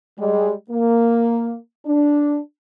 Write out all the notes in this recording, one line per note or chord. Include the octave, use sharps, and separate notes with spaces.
G3 G#3
A#3
D4